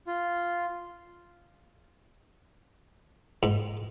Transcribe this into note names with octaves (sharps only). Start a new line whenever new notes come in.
F4
G#2